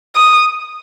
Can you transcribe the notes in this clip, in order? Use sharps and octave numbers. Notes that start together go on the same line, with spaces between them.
D#6